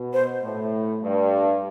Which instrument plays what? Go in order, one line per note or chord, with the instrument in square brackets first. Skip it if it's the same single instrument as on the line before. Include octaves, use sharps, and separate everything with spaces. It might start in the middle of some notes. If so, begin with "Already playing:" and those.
Already playing: [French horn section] B2
[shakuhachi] C5
[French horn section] A2
G2